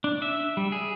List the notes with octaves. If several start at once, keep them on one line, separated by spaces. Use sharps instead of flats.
D4
E5
G3
G#4